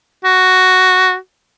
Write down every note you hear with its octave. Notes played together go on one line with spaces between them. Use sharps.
F#4